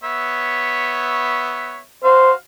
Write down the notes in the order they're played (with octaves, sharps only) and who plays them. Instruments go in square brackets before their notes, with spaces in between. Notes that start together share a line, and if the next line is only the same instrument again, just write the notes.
[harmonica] B3 C#5 E5
[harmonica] F#4 F5 [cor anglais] C5